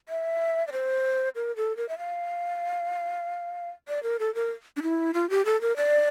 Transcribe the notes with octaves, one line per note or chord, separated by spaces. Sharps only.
E5
D5
C5
A#4
A4
A#4
E5
F5
D5
A#4
A4
A#4
D4
E4
F4
G4
A4
A#4
D5